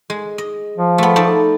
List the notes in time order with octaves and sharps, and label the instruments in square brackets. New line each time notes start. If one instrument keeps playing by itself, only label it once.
[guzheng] G#3
D#5
[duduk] F3
[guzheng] A3 B3
A3 D#4 D5